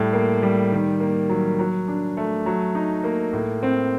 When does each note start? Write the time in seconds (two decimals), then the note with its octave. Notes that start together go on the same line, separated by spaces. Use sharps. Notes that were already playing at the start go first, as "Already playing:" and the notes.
Already playing: A2 G3
0.13 A#3
0.42 G3
0.72 D#3
1.00 A#3
1.29 F#3
1.59 F#3
1.88 D4
2.17 A3
2.46 F#3
2.75 D#4
3.04 A#3
3.33 A2
3.63 C4